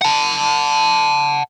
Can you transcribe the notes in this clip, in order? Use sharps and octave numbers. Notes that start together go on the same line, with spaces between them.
F#5 A5